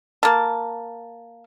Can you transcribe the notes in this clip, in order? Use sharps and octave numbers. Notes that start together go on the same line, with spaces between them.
A#3 A5